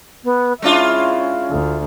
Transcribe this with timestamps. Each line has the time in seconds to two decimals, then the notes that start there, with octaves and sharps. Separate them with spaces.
0.24 B3
0.62 G#3 C#4 D4 E4 F4
1.51 D2